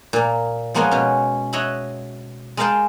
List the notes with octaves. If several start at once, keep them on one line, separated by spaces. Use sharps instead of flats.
A#2 A#3
F3 G#3 A#3 B3 C#5 D#5
B2 C#4
C#5 D#5 E5 F#5 B5
G#3 A#4 D#5 F5 G5 A5